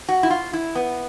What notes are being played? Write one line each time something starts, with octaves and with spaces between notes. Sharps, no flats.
F#4
E4
F4
E4
B3